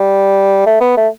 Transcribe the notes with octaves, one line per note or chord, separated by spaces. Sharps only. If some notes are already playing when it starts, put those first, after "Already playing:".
Already playing: G3
A3
B3
A3